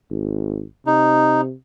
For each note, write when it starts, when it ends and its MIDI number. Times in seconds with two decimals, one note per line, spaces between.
0.10 0.64 32
0.87 1.54 48
0.87 1.41 63